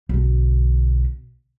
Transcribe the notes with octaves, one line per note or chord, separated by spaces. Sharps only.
B1 D3